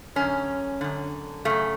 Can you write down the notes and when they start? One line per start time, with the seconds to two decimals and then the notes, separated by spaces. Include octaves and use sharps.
0.16 F#2 D3 C#4
0.81 F#2 D3
1.45 F#2 C#3 A3